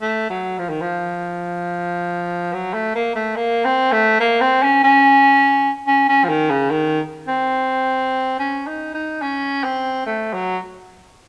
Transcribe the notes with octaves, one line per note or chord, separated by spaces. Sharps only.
A3
F#3
F3
D#3
F3
F#3
A3
A#3
A3
A#3
C4
A3
A#3
C4
C#4
C#4
C#4
C#4
F3
D#3
C#3
D#3
C4
C#4
D#4
D#4
C#4
C4
A3
F#3